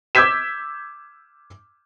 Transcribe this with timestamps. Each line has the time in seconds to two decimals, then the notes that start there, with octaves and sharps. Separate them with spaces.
0.15 D6 E6 G6 G#6 B6 E7